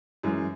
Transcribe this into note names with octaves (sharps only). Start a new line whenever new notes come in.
F#2 E3 G#3